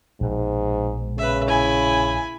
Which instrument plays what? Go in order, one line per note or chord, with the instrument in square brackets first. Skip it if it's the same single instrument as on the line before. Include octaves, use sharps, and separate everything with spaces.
[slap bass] A#1 B2 G#3 [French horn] G#2
[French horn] C#3 [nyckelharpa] B4 E5
[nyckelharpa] E4 B5 [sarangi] G#5